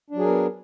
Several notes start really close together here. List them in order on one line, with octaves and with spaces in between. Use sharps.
D4 F#3 G#4 A#4 B3